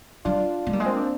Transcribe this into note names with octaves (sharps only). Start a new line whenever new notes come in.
G3 D4 F4
G#3
G3 A#3
G#3
C4
D4